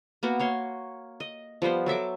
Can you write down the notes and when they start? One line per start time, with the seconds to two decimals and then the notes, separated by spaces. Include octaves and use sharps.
0.23 A#3 B3 F#4
0.39 A#3 C#5 C6
1.20 D#5
1.62 F3 G3 B3 C5
1.86 F#3 A4 E5 D6